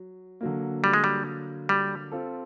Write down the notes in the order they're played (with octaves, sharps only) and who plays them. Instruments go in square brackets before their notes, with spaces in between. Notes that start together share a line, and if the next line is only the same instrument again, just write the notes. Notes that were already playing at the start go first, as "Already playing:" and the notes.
Already playing: [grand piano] F#3
D3 F#3 A#3
[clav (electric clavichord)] G3
G#3
G3
G3
[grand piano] C4 F4 A4